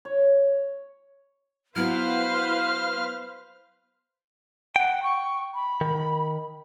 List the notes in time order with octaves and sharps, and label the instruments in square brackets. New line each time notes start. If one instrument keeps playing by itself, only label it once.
[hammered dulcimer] C#5
[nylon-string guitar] F#3 B3 F#4 [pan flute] E4 [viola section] B4 C5 F5 [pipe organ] F6
[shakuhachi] F#5 [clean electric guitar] G5
[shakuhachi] C#6
B5
[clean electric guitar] D#3